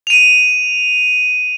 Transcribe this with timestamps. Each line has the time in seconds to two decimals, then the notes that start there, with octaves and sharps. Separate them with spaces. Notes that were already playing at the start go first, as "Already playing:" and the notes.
0.07 D#7 F7